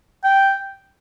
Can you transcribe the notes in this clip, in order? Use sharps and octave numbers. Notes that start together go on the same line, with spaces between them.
G5